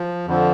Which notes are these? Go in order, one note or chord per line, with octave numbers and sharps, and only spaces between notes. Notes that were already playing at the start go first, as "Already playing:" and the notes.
Already playing: F3
F2 D3 F3